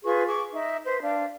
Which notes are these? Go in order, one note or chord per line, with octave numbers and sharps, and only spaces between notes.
F4 G#4 B4 C#6
G#4 C#6 D6
D#4 E5
B4 C5
D4 F5